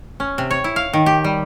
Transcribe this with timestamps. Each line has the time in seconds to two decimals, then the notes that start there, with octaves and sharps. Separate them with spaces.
0.20 C#4
0.38 C3
0.51 C#5
0.64 E4
0.76 F5
0.93 D#3
1.06 G4
1.24 G3